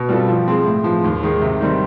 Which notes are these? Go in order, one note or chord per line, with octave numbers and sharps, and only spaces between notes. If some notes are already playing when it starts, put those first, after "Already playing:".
Already playing: B2
G3 C4 F4 A4
F3
G#3 C4
A2
F3 G#3
D#2
D#3 G#3
C3
D#3 G3 C4